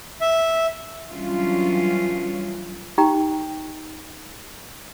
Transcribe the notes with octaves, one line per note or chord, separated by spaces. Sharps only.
E5
E3 F#3 G3 C#4 D4 F4
D#4 G4 G5 A#5